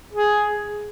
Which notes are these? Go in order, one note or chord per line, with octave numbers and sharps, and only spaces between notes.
G#4